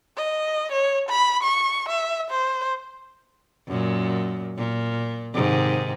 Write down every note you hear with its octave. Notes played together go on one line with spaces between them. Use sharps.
D#5
C#5
B5
C#6
E5
C5
F#2 A#2
A#2
G#2 C3 D#3